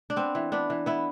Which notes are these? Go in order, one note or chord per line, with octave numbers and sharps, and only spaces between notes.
D4
B3 C4
E3
B3 D4
E3
B3 E4